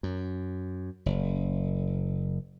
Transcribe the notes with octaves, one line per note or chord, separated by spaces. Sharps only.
F#2
F#1